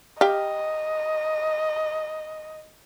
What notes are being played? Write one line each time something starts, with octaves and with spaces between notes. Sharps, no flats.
G4 D#5 F5